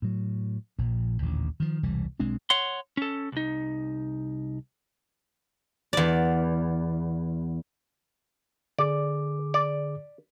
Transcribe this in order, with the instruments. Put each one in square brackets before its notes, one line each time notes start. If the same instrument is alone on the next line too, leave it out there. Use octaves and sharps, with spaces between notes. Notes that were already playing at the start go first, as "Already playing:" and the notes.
[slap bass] A2 F#3
A#1 A#2 F3
A1 D#2 A#2 D3
D#3 F3
E1 C2 E3 G3
B1 G#3 C4 D4
[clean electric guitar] C#5 F#5 C6
C#4 A4
C2 D#4
[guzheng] E2 D5
[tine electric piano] D3 G#4 D6 [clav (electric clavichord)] D5
[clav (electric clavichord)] D5